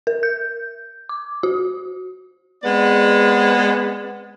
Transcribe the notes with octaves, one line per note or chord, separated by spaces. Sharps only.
A#4
G6
D6
F#4
G#3 B3 C4 D5 F#5